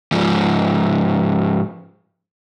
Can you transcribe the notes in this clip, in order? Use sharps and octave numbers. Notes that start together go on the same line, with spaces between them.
G#2 F3